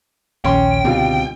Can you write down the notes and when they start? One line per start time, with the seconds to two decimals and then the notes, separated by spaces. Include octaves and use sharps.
0.44 A#1 D#2 C#4 G5 C6
0.84 C#2 B2 D3 G3 C4 F4